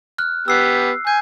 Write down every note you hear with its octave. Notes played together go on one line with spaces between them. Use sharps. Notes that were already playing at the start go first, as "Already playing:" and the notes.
F6 F#6
B3 G4 E6 C7
G#5 G6